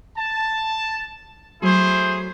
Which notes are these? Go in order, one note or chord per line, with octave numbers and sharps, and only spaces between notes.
A5
F#3 A3 E4 G#4 C5